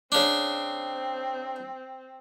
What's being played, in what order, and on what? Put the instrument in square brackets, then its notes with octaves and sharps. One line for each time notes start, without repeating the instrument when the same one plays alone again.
[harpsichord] C#3 D4 [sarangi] C4